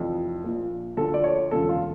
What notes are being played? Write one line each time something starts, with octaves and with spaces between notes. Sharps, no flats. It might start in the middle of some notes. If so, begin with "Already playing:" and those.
Already playing: F1 F2 E3
A#1 A#2 F3
D2 D3 F3 A4
D5
C#5
E1 D2 C#3 F3 A4
F4